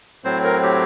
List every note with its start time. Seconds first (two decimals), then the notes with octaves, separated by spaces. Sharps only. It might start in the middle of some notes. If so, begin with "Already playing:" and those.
0.24 A2 F#3 C4 C5
0.44 A#4
0.63 G4